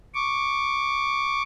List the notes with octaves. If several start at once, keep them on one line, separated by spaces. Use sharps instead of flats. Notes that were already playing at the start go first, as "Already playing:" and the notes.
C#6 D6